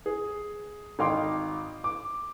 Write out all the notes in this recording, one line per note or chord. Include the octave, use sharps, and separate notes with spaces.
G#4
G#1 D#4 F5 G5 C6 D6
D6